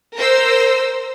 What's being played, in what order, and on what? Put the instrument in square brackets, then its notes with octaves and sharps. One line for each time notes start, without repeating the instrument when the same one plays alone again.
[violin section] A#4 C5 E6